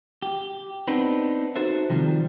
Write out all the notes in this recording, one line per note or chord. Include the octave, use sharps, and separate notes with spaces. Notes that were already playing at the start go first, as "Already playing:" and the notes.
G4
B3 C4 D4 D#4 B4
D#4 F#4 A4 C5 E5
C3 D#3 F3 G3